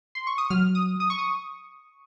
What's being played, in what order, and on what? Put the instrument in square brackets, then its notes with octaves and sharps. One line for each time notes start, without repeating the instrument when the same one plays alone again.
[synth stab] C6
C#6
D#6
[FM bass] F#3 [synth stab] F6
[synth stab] D#6
D#6
C#6
D#6